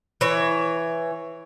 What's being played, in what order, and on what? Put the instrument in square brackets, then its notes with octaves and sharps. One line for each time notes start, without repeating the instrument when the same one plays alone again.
[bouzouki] E3 C#5